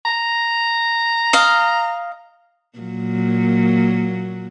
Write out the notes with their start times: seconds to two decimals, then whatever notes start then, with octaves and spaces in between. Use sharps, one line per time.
0.05 A#5
1.33 D#5 F5
2.79 A#2 F#3 A#3